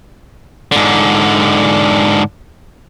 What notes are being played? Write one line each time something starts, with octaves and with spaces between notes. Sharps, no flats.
G#2 D3